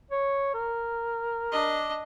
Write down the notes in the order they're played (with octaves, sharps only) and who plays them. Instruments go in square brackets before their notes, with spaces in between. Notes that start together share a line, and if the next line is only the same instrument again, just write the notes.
[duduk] C#5
A#4
[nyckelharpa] D4 D#5